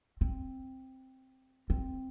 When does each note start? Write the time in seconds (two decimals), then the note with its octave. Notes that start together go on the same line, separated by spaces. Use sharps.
0.21 C4
1.70 C4